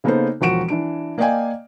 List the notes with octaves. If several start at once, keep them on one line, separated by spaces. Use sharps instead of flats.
C#3 A#3 B3 D#4 A4 C5
E1 F3 F#4 D7 E7
E3 D4 D7
A#3 D5 D#5 F5 G5 G#5